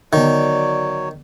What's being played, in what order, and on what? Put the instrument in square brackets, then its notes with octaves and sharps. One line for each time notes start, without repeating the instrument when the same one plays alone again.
[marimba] D3 B3 [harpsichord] D#3 [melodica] F#3 C#5 [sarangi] D5